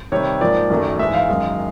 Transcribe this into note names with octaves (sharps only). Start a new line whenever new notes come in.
C3 D#3 G3 C#5
G#2 F3 A#3 D5
F#2 D#3 F#3 A3
G#2 E3 G#3 E5
F5
F#2 D#3 G#3